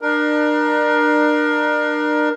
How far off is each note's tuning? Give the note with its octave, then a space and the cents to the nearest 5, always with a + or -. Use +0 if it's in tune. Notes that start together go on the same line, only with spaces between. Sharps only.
D4 +35 A#4 +20